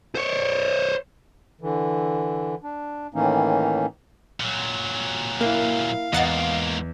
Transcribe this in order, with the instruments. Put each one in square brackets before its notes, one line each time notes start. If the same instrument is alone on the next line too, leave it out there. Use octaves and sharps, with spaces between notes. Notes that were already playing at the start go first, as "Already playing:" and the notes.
[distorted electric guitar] C5 C#5
[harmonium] D3 E3
D4
A2 D#3 E3 A#3 C#4 D#4
[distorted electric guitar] A#2 F#3
[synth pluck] A#3 [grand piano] E4 A#4 [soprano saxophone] F5
[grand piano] E2 [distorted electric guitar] G#2 A#3 [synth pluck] D#5 F#5 A6